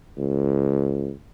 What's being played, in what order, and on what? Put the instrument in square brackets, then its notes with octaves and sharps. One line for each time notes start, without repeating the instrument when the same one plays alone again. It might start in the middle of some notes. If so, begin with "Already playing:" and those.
[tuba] C#2